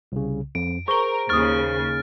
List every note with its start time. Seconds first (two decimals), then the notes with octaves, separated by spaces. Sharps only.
0.12 C2 C#3
0.55 F2 D7
0.88 G#4 A#4 C5 C#6 G7
1.29 D#2 C#3 C#6 D#6 F6 A6